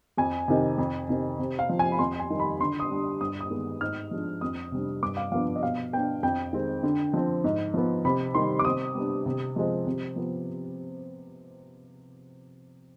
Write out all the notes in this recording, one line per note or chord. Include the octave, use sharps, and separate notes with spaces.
F2 G#5
C3 D#3
F2
C3 D#3
C3
F5
F3 C4
G#5
B5
F2 C6
G#5
D#3 G3
B5
D3 C6
D#6
G3 D4
G2 D#6
D#6
D#3 G#3 B3
G#2 F6
F3 G#3 D4
F2 D#6
C3 G3 D4
G2 D6
F5
F3 B3 D4 F5
D#5
B2 F5
B3 D4 G5
F2 G5
D#3 G#3 C4
D3
F3 C4
G#2
F3 B3
C3 B5
D#3 G3 C6
D6
C3 D#6
G3 B3 D4
C3
F3 G#3 C4
C3
F3 B3